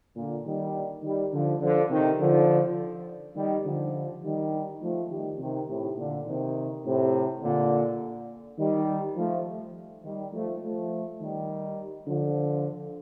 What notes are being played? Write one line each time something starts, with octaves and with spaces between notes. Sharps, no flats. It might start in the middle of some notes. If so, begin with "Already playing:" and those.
A#2 D3
D#3 G3
D#3 G3
D3 F3
D3 F3
C3 D#3
D3 F3
D#3 G3
D3 F3
D#3 G3
F3 A3
D#3 G3
C3 D#3
A2 C3
A#2 D3
C3 D#3
A2 C3
A#2 D3
D#3 G3
F3 A3
D#3 G3
F3 A3
F3 A3
D#3 G3
D3 F3